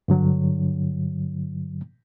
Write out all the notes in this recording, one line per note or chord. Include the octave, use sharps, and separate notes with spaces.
G2 D3 F#3